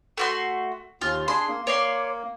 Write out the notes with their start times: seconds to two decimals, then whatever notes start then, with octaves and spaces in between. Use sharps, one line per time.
0.18 A3 F#4 C6
1.01 D#2 F4
1.28 D4 G#4 C6
1.48 A#3
1.67 A#3 C#5 D5 C6